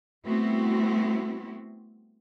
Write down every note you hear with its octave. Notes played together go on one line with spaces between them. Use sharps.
G3 A3 B3 C4 E4 F#4